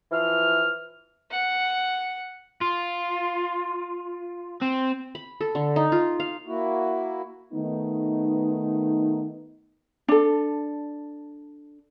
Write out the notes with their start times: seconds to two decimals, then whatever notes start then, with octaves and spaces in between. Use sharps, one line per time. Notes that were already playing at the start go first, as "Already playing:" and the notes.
0.12 E3 F3 F6
1.31 F#5
2.61 F4
4.62 C4
5.15 B5
5.41 A4
5.55 D3
5.76 D#4
5.92 F4
6.20 F5
6.46 A#3 E4 F#4
7.53 D#3 A3 B3 D#4
10.08 D4 A4